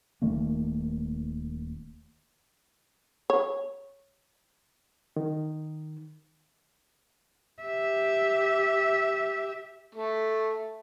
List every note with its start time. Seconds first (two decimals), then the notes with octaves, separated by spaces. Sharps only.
0.22 D#1 D#3 A3 A#3
3.30 C#5
5.16 D#3
7.63 G4 E5
9.95 A3